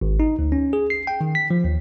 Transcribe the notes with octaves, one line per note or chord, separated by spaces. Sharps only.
G#1
D#4
D2
C#4
G#4
C7
G5
D#3
B6
F3
D#2